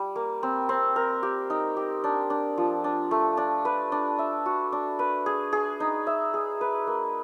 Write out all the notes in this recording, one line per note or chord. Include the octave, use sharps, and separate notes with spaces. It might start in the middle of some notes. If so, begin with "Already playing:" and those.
Already playing: G3
A#3
C4
C4
A#4
G4
D#4
G4
D4
D4
F3
D4
A3
D4
B4
D4
E5
F#4
D4
B4
G#4
G#4
D#4
E5
G#4
B4
A#3